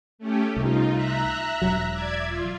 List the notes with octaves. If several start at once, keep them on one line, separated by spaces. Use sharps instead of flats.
A3 C#4 G4
C2 D#4 F4
E5 A#5 F#6
E1 F#3
D5 E5 G#6
F4